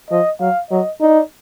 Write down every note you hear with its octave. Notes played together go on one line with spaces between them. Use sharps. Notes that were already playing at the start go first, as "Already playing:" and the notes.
F3 D#5
F#3 F5
F#3 D#5
D#4 D5